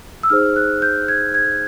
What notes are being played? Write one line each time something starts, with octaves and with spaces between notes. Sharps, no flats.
E6
D#4 G#4 C5 F6
F#6
G6
G#6
G#6